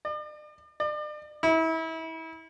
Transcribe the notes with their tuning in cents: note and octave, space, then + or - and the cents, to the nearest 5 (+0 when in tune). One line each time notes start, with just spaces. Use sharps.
D5 +45
D5 +40
E4 -30